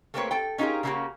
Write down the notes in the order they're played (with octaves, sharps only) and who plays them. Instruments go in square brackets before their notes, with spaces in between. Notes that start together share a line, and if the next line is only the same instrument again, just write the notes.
[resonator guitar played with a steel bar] A3 A#3 C4 G4 B4 C#5
A4 G5
C#4 D#4 F4 G4 G#4 A#4
C#3 F#3 A#3 C#4 F#4 G4